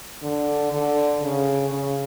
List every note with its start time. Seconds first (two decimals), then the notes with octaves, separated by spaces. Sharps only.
0.23 D3
0.72 D3
1.22 C#3
1.72 C#3